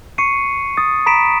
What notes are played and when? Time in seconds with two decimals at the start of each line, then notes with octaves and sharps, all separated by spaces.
0.18 C#6 C7 C#7 D#7
0.77 D#6 A6
1.06 A#5 B5 B6 D7 E7